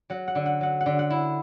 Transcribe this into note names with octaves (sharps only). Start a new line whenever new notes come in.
F#3 F#5
F#5
D3
F#5
F#3 F#5
F#5
D3
F#5
E4